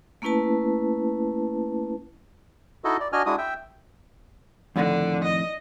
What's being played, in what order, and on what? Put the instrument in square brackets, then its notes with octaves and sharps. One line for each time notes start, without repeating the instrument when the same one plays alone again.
[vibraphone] A3 A#3 C#4 E4 B4 A5
[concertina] D#4 E4 F#4 A4 D#5
D5
D4 F#4 D#5 G#5 F6
G#3 D4 E4 F#4 D#6
E5 G5
[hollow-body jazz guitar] F2 A2 D#3 [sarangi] D3
[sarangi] D#5